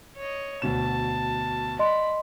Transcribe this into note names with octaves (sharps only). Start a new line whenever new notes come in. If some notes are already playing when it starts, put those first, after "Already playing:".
C#5 D#5
D2 B2 A5 E7
D5 D#5 B5 C6